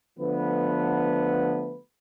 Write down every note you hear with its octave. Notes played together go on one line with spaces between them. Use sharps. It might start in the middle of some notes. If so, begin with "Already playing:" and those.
D3 F3 A3 B3 B4